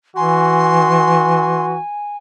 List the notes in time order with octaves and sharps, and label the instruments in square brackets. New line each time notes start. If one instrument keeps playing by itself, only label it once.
[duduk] E3 [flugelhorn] F#4 [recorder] G#5 [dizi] C6